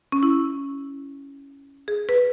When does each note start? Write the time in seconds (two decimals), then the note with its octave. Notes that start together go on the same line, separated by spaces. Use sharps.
0.12 C#4
0.23 E4
1.88 G#4
2.09 B4